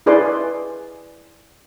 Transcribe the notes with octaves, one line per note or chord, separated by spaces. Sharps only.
E4 G#4 B4 D5 G#5 C6